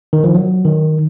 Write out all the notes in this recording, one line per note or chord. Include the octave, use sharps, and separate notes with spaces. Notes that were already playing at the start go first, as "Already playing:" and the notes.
D#3
F3
F#3
D#3